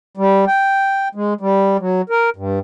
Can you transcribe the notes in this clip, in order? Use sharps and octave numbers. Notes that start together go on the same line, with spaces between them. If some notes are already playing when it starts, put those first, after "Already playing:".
G3
G5
G#3
G3
F#3
A#4
G2